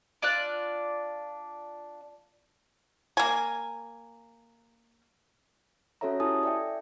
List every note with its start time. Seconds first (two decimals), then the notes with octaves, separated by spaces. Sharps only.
0.22 D4 F4 D5 F#6
3.17 A#3 G#5
6.01 C#4 F#4 A4 C#5 E5 A#5
6.20 E4 G4 A4 G#5 A5 D#6
6.43 D5 E5 G5